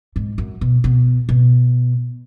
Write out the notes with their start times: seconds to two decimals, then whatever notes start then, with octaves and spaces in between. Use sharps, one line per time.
0.16 G#2
0.38 F#2
0.61 B2
0.84 B2
1.29 B2